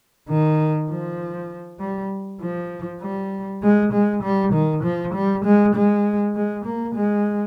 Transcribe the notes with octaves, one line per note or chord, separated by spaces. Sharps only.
D#3
F3
G3
F3
G3
G#3
G#3
G3
D#3
F3
G3
G#3
G#3
G#3
A#3
G#3